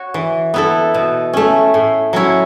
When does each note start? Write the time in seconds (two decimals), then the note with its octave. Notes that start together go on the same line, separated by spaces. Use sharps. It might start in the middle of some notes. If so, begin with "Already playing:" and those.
Already playing: F#4 C#5
0.14 E3
0.54 B3 E4 A4
0.94 B2
1.33 A3 C#4
1.74 A2
2.13 F#3 C#4 E4 C#5